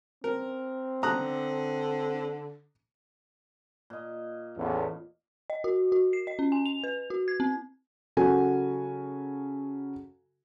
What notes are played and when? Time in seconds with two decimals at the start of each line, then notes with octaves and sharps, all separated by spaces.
0.24 C4 A#4
1.03 D3 A#5 D#6 F#6
3.90 A#2 D#5
4.57 A1 E2
5.50 D#5
5.64 F#4
5.92 F#4
6.13 C7
6.27 D#5
6.39 C#4
6.52 G#5
6.65 F7
6.84 B4
7.10 F#4
7.28 G#6
7.40 C4
8.17 C#3 F#3 F#4 A4 G#5